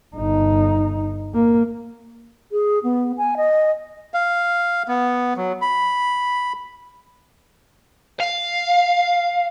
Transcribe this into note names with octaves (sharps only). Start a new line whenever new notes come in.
G1 D#4
A#3
G#4
B3
G#5
D#5
F5
B3
F#3
B5
F5